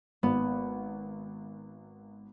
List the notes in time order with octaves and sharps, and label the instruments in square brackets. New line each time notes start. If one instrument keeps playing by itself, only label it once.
[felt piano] G#1 [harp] B3